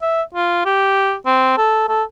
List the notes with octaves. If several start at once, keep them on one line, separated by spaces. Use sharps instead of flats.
E5
F4
G4
C4
A4
A4